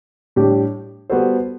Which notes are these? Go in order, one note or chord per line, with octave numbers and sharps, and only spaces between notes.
A2 G3 D4 G4
G3 B3 F#4 A4 C5